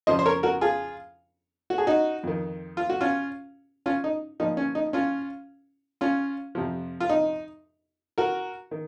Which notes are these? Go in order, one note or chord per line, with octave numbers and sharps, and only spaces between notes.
F2 C#3 F3 C5 D#5
C5
A#4 C#5
F#4 A#4
F4 G#4
F#4
G#4
D#4 F#4
F2 D#3
F4
F#4
C#4 F4
C#4 F4
D#4
A#2 F3 D#4
C#4
D#4
C#4 F4
C#4 F4
F2 C3 F3
F4
D#4
F#4 A#4
D#3